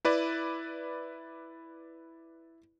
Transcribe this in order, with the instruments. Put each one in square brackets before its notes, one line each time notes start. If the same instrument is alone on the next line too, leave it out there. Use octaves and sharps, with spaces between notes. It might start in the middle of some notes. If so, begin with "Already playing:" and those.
[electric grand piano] E4 B4 D5